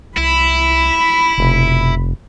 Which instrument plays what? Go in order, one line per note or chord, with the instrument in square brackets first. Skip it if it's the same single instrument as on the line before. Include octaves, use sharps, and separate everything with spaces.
[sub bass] C2 [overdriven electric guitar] E4 [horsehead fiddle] B5
[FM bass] F1 [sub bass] B2